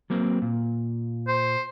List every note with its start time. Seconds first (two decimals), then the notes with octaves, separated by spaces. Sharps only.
0.10 F#3 A#3 C4
0.42 A#2
1.28 C5